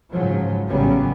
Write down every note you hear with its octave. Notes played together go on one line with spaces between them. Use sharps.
G#2 C#3 F3 F#3
A1 C#3 F#3 G3 B3 C#4